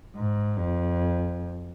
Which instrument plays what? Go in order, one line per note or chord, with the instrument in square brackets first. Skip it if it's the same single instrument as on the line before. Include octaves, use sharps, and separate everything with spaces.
[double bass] G#2
F2